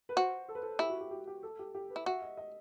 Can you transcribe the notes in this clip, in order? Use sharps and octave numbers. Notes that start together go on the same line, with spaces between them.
B4
F#4 C5
A4
B4
A4
E4 G4
F#4
G4
G4
G4
A4
G4
G4
B4
E4
F#4 E5
D#5
D#5